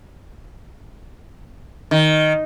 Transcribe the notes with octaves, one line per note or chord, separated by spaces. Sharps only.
D#3